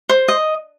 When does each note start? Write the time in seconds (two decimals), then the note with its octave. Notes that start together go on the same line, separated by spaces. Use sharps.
0.09 C5
0.28 D#5